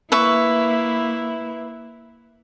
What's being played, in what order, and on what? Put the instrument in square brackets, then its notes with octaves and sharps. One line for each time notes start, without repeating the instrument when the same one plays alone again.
[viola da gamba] A#3 E4 [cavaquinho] B4 E5 C#6